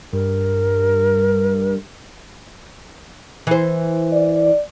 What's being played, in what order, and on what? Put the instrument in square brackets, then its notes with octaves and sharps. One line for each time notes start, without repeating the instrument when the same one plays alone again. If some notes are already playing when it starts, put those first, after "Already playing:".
[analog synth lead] G2 [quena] A#4
[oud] E3 C5
[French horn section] D5